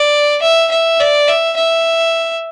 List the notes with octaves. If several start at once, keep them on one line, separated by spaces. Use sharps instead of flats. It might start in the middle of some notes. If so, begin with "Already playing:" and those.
Already playing: D5
E5
E5
D5
E5
E5